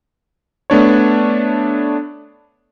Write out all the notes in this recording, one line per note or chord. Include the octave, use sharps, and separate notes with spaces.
A3 B3 D4 C#5